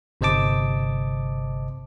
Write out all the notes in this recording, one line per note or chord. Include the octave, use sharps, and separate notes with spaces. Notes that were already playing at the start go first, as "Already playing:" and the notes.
G1 C3 C5 D#5 A5 D6